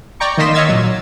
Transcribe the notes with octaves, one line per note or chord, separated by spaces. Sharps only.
D5 G5 A#5 C#6
D#3 A#3 D#5 C6 B6 E7
C#5 D#5 F5 E6 G#6 A6
A#2 F#3